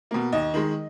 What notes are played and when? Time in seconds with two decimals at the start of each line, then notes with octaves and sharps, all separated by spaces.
0.11 B2 A#3
0.32 D#2 D#5
0.54 D#3 G#3